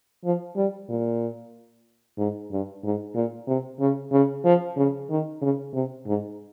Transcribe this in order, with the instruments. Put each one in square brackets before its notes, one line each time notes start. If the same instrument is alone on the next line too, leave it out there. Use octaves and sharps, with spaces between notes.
[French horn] F3
G3
A#2
G#2
G2
G#2
A#2
C3
C#3
C#3
F3
C#3
D#3
C#3
C3
G#2